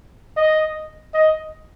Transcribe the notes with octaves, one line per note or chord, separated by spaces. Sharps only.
D#5
D#5